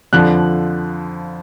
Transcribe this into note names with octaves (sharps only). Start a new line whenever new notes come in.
F2 D3 F3 F#6